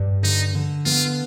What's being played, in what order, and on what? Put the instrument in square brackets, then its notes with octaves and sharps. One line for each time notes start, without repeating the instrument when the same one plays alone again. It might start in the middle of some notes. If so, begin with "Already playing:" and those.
Already playing: [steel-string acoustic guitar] G2 G3
[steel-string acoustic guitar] D3 [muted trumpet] D#4
[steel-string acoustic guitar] D3
[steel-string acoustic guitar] B3 [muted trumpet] F4